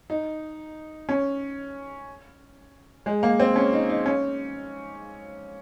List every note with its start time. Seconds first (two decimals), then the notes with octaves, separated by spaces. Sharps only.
0.10 D#4
1.09 C#4
3.06 G#3
3.23 A#3
3.40 C4
3.56 C#4
3.73 D#4
3.89 D#4
4.06 C#4